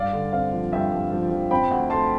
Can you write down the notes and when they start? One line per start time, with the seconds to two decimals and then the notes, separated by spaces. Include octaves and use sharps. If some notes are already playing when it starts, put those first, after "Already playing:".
Already playing: G2 D5 F5
0.13 D3
0.32 C4 D5 F5
0.53 F3
0.72 G2 E5 G5
0.92 G2
1.12 F3
1.31 F3
1.51 C4 G5 B5
1.71 D2
1.90 A3 A5 C6